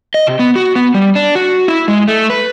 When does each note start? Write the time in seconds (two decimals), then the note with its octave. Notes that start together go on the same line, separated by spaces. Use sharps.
0.14 D#5
0.27 C3
0.39 B3
0.56 F#4
0.76 B3
0.94 G3
1.15 D4
1.35 F#4
1.68 E4
1.88 G#3
2.08 A3
2.30 B4